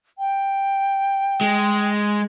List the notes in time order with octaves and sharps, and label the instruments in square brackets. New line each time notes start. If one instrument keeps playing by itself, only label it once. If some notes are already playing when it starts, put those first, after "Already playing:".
[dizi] G5
[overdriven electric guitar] G#3